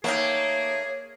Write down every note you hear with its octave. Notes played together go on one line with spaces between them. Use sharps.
D#3 A3 A#3 G#4 C#5